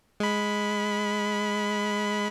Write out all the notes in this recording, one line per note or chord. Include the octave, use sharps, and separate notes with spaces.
G#3 B5